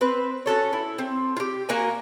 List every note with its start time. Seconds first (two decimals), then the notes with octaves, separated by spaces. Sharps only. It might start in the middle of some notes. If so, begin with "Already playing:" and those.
0.01 C4 B4
0.46 C#4 F#4 A4 C#5
0.73 E4
0.98 C4
1.37 F4 G4
1.69 A#3 F#4 A#4 G#5